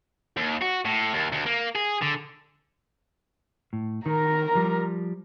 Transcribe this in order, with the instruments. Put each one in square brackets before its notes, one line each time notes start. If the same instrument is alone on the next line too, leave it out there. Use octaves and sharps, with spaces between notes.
[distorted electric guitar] D#2
F#4
A2
D#2
D2
A#3
G#4
D3
[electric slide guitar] A2
[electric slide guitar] D#3 [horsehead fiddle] A#4 A#5
[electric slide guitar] F3 G3